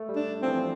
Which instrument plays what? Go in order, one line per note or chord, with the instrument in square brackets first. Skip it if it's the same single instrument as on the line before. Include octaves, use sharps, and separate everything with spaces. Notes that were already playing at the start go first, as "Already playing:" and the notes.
Already playing: [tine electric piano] A3
G3
[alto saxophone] D4
[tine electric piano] F3 [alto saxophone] C4
[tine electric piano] E3